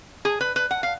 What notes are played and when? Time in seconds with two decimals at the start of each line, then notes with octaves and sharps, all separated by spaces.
0.25 G#4
0.41 B4
0.56 B4
0.71 F#5
0.83 F5